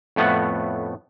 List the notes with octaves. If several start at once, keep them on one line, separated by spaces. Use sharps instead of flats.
F2 A2 A3 B3 F#5